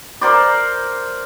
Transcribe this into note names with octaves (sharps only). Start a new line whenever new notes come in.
A#4 C5 D5